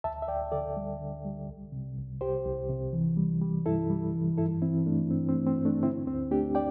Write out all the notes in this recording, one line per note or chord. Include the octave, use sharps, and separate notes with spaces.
D2 E5 A5
E5
D2 D5 G5
D3 A4 D5
G3
D3
G3
C2
C3
C2
C2 G4 C5
C2
C3
E3
G3
G3
G2 E4 A4
G3
E3
G2 E4 A4
E3 C4 E4
G2 A3 D4
G2 C4
C4
A3
C4
G2
A3 D4
D3 C4 E4
D2 C4
A3 D4 G4
D5 G5